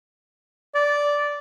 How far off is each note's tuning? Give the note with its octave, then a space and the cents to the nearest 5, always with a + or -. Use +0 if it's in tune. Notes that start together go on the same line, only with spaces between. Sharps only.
D5 -10